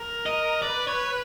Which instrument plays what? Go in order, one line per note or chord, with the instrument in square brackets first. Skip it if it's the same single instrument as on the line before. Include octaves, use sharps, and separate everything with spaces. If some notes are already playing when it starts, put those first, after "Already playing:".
Already playing: [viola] A#4
[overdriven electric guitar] D#5
[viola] B4 [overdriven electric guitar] D5
[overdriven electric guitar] C#5